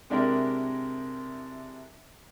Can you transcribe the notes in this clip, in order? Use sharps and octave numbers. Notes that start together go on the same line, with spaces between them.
C3 G#3 D4 E4 G4 A#4